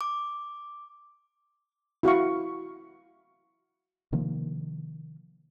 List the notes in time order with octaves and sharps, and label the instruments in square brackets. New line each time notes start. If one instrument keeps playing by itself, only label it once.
[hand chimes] D6
[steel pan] E4 F#4 F5 C#6
[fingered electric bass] C3 D#3 F3 A#3